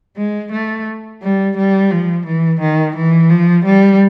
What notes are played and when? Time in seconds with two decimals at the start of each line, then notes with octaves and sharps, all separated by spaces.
0.17 G#3
0.52 A3
1.22 G3
1.57 G3
1.91 F3
2.26 E3
2.61 D#3
2.96 E3
3.30 F3
3.65 G3